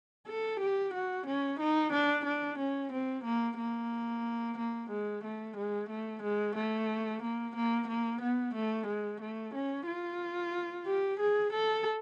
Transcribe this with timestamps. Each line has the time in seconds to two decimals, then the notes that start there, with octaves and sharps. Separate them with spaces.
0.27 A4
0.60 G4
0.94 F#4
1.26 C#4
1.60 D#4
1.93 D4
2.25 D4
2.58 C#4
2.92 C4
3.24 A#3
3.58 A#3
4.58 A#3
4.90 G#3
5.24 A3
5.57 G#3
5.89 A3
6.23 G#3
6.56 A3
7.22 A#3
7.56 A#3
7.88 A#3
8.21 B3
8.54 A3
8.87 G#3
9.21 A3
9.55 C#4
9.87 F4
10.86 G4
11.19 G#4
11.52 A4